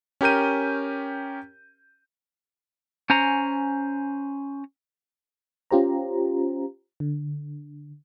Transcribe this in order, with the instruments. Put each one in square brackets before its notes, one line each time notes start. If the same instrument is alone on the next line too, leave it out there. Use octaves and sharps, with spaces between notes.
[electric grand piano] C#4 G4 A#4 G6 D#7
[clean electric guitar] C#4 C5 G#5 A#5
[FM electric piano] C#4 F4 G4 C5 A#5
D3